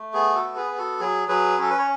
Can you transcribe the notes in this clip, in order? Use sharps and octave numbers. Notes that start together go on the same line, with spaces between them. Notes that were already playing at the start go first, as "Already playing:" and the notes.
Already playing: A3
B3 G#4
F#4 A4
B3
G#4 B4
B3
F#4 A4
F#3 G#4
F#3 G#4 B4
C#4 A4
B4
C#5